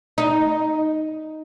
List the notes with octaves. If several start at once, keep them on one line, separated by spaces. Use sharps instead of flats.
D#4